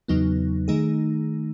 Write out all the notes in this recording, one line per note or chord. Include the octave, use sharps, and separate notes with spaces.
E2 C#3 F#3 B3 D#4
D#3 A3 D#4 G#4